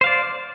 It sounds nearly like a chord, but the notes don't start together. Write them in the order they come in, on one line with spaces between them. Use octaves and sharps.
C5 F5 D5